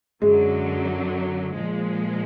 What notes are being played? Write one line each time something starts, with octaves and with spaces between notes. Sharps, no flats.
F#2 D3 F#3 G#3
A#2 F3 G#3